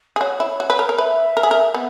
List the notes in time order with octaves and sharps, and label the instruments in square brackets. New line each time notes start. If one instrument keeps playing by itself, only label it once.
[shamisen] G#4
[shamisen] F#4 [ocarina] C#5
[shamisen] E4
F#4
B4
A#4
A#4
[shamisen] B4 [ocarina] E5
[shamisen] A#4
G#4
A#4
B3